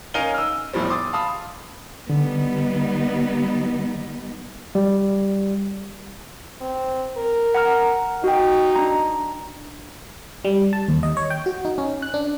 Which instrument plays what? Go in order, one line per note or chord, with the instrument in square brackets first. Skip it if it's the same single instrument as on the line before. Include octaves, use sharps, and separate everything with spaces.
[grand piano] C#4 D#4 A#4 F5 D#7 G7
E6 F6
E2 A2 F3 G3 C4
C6 D6 D#6 A6
F5 A5 B5 D#6
[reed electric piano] D3 [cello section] G3 B3 D#4
[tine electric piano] G3
[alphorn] C4
A#4
[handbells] F#5 A#5 F6
[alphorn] D#4 [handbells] F#4 G5
[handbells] D4 A#5
[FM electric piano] G3
A5
D#2
D#5
C#5
G5
F#4
D#4
C#4
F#6
D4